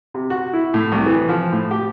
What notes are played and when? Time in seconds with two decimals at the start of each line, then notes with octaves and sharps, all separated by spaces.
0.14 C3
0.30 F#4
0.53 E4
0.74 A2
0.92 C2
1.06 E3
1.29 F3
1.52 A2
1.71 G4